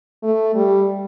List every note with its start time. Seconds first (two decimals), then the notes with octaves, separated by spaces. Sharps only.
0.24 A3
0.55 G3